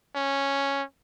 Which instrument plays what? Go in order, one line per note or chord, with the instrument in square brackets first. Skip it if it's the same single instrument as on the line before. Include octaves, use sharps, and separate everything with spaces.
[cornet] C#4